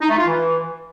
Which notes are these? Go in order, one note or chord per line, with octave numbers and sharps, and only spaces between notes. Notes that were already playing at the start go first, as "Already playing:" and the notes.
D#4
A3
F4
E3